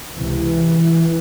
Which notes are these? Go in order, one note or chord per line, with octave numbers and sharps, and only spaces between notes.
C#2 C3 E3